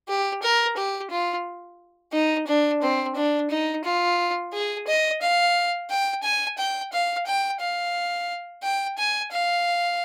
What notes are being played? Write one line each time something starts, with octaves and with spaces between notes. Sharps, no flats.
G4
A#4
G4
F4
D#4
D4
C4
D4
D#4
F4
G#4
D#5
F5
G5
G#5
G5
F5
G5
F5
G5
G#5
F5